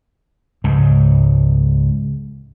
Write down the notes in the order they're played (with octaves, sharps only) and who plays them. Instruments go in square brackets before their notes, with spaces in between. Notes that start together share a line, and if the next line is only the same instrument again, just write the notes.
[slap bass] C#2 G#2